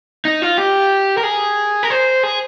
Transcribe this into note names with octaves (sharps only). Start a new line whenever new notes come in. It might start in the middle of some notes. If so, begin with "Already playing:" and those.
D#4
F4
G4
A#4
G#4
A#4
C5
G#4